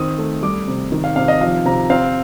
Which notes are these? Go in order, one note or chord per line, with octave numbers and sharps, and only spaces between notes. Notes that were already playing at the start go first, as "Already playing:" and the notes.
Already playing: D#3 C4 D#6
A3
G3 D6
C3
D#3
F5
C3 F5
D#5
F3 F5
C3 A#5
C4 F5